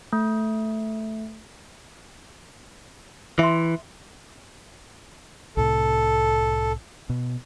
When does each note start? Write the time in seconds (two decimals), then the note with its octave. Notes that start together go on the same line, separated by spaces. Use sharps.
0.13 A3
3.39 E3 E5 C6
5.57 C2 A2 C3 A4
7.10 B2